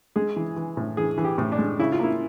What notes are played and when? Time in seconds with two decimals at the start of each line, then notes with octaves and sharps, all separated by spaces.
0.16 G#3 G#4
0.36 E3
0.56 E3
0.77 A2
0.97 E3 G#4
1.18 E3
1.24 G4
1.38 A2
1.52 D4
1.59 G#3
1.79 C#3 E4
1.92 F4
1.99 A#3 E4